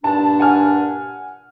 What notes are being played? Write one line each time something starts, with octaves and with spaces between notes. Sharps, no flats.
G2 A#2 D4 A5
F#5 G#5 F6